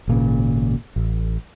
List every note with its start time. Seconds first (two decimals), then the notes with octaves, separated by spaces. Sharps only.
0.08 G#1 A#2 C#3
0.96 A1